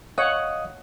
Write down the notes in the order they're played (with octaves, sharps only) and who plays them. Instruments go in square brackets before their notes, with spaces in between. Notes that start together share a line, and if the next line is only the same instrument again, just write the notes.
[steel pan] C#5 F#5 [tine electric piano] D#5 F5 D#6